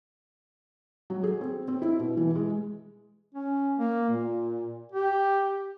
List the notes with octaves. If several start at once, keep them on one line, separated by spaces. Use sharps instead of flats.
F#3
G#4
C4
C4
E4
B2
E3
G#3
C#4
A#3
A#2
G4